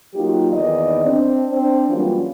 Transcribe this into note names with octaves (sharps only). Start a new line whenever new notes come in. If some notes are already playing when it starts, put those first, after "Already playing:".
F#3 A#3 D#4 F4 G4
E2 D#3 A#3 D5 D#5
C4 D4
C4 D4
E3 F#3 G3 A#3 C#4 F4